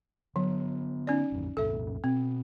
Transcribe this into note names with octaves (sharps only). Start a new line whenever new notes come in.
D3 F#3 B3
C#4 D#4 D5
A1 F2
C2 F#2 A#2 A4 E5
B2 C4